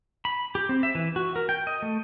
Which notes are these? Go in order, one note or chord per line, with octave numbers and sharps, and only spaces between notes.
B5
G4
C4
E5
E3
F#4
A#4
G5
D#5
A3